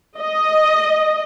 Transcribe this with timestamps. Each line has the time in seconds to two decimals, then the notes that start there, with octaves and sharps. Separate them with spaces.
0.18 D#5